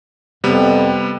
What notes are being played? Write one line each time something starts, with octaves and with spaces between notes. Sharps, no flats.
F2 C3 G3 B3